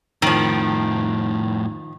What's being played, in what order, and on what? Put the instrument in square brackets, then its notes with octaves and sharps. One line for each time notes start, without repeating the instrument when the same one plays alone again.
[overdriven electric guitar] F2 A2 [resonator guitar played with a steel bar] D#3 F3